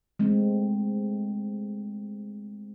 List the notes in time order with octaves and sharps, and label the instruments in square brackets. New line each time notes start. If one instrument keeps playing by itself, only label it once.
[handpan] G#3 A3 C4